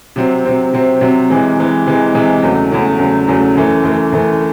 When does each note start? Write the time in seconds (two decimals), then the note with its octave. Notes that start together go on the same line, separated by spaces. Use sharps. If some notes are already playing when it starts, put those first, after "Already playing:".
0.16 C3 F#3 C4
0.45 C3 F#3 C4
0.73 C3 F#3 C4
1.01 C3 F#3 C4
1.30 C3 E3 G#3
1.58 C3 E3 G#3
1.86 C3 E3 G#3
2.14 C3 E3 G#3
2.43 E2 C#3 F#3 A3
2.71 E2 C#3 F#3 A3
2.99 E2 C#3 F#3 A3
3.28 E2 C#3 F#3 A3
3.56 F#2 E3 A3
3.83 F#2 E3 A3
4.12 F#2 E3 A3